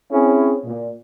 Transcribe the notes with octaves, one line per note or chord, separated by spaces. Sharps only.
C4 C#4 E4 G#4
A#2